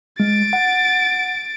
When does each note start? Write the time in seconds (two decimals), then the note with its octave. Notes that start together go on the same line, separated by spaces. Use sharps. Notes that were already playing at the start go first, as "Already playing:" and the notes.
0.20 G#3 A6 D7
0.53 F#5